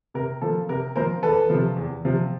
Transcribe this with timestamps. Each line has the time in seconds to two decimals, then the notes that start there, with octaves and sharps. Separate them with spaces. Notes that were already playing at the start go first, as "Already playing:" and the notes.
0.14 C3 A#4
0.42 F3 A#3 A4
0.69 C3 A#4
0.96 F3 A#3 A#4 C5
1.23 E2 A4 B4
1.50 C3 F3
1.76 E2
2.05 C3 F3